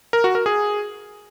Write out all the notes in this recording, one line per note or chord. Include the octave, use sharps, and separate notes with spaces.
A#4
F#4
A#4
G#4